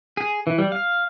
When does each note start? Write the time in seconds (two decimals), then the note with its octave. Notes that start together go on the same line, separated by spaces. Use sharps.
0.17 G#4
0.47 E3
0.58 G3
0.72 F5